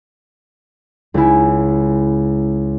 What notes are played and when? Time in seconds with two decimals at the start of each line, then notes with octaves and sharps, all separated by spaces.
1.14 C#2 E4